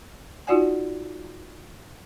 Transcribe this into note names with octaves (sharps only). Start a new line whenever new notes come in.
D#4 F4 F#4 D5 F#5 G#5